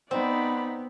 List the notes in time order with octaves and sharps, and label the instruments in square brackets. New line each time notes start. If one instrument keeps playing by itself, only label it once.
[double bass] B3 [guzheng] C4 [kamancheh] D#4 F#5 [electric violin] D5 B5